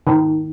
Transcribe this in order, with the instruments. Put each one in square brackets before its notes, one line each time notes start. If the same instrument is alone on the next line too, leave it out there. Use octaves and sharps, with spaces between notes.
[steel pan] D#3